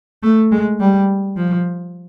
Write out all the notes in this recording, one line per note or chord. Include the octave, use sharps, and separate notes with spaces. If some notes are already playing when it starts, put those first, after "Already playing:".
A3
G#3
G3
F3